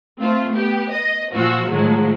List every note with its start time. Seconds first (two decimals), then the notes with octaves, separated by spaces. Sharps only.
0.20 A3 C4 F4
0.56 B3 G4
0.92 D#5
1.33 A#2 F3 F4 F#4 E6
1.70 A2 D#3 F3 F#3 G#3